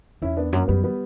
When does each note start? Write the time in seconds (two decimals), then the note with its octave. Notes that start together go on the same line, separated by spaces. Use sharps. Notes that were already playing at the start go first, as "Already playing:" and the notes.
0.22 E2 C#4 E4
0.37 B3 D4
0.53 F#2 A#3 C#4
0.68 F#2 G3 B3
0.84 G3 B3